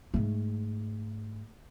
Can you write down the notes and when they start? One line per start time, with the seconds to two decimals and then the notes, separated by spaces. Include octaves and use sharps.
0.14 G#2 A3